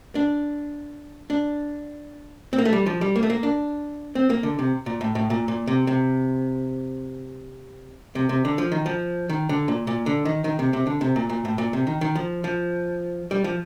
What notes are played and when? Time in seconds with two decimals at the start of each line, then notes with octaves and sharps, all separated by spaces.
0.15 D4
1.30 D4
2.53 C4
2.58 A#3
2.65 A3
2.73 G3
2.86 F3
3.01 G3
3.16 A#3
3.23 A3
3.30 A#3
3.43 D4
4.15 C4
4.30 A#3
4.43 D3
4.59 C3
4.86 A#2
5.01 A2
5.15 A2
5.30 A#2
5.48 A#2
5.67 C3
5.87 C3
8.15 C3
8.29 C3
8.45 D3
8.58 F3
8.72 D#3
8.86 F3
9.29 D#3
9.49 D3
9.68 A#2
9.87 A#2
10.06 D3
10.25 D#3
10.44 D#3
10.59 C3
10.73 C3
10.87 D3
11.01 C3
11.16 A#2
11.30 A#2
11.45 A2
11.58 A#2
11.73 C3
11.87 D#3
12.01 D#3
12.15 F3
12.44 F3
13.31 G3
13.44 F3